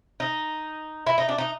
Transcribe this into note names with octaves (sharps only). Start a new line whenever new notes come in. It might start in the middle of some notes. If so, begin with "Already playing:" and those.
D#4
E4
D#4
D4
D#4